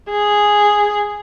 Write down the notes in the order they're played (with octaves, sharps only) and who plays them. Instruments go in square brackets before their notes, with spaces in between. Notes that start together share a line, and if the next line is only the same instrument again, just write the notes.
[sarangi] G#4